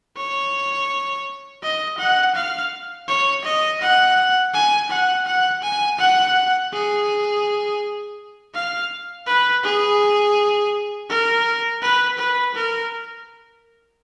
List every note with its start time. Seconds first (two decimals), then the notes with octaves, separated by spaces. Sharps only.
0.17 C#5
1.63 D#5
1.98 F#5
2.35 F5
3.08 C#5
3.45 D#5
3.82 F#5
4.54 G#5
4.90 F#5
5.26 F#5
5.63 G#5
5.99 F#5
6.73 G#4
8.55 F5
9.26 B4
9.64 G#4
11.10 A#4
11.81 B4
12.18 B4
12.54 A#4